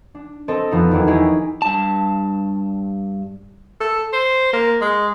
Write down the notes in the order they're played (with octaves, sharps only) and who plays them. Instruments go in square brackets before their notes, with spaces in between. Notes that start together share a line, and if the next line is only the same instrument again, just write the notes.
[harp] D4
C4 A4 D#5
F2 F3 B3 D#4
E2 D#3 F#3 A#3 D4
E4 G4 G#4 C#5 D#5
[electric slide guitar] G2 A5
[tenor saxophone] A4
C5
A#3
G#3